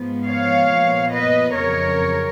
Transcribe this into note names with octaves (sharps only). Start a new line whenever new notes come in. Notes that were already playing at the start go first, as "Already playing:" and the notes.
Already playing: G#2 F3 B3
C#5 F5
A#2 F3 B3
B4 D#5
F2 C#3 F#3 A#4 C#5